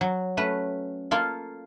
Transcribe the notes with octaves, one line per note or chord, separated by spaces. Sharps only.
F#3
A3 C#4 B4
A#3 F4 A4